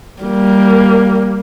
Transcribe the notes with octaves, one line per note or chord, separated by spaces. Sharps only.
G3 A#3